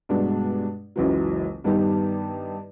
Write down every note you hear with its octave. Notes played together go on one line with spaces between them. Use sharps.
G2 B2 G#3 D4
F#1 C#2 E3 F#3
G2 D#3 G3 B3 D#4 G4